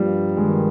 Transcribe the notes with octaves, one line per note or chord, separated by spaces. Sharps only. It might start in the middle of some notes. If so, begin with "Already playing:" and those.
Already playing: G2 F3 G3 A#3
D#3 G#3